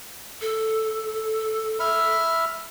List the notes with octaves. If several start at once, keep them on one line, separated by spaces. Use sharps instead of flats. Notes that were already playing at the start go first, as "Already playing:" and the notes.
A4
E5 B5 F6